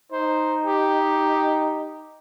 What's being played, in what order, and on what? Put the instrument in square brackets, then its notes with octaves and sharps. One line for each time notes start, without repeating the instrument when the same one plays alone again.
[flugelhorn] D#4 [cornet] C5
[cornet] G4